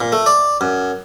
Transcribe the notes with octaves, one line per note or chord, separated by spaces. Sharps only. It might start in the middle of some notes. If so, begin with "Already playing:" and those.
A#2
A3
D5
F#2